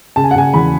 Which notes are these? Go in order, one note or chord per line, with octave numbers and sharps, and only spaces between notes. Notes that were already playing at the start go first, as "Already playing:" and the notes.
C#3 A5
G#5
F#5
C#3 G#5
E2 B5